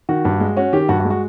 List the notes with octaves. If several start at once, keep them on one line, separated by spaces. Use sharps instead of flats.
D#3 F#4
G2
G#3
C#4 F#4
D#3 G4
G2 F#4
F#4
G#3
F#4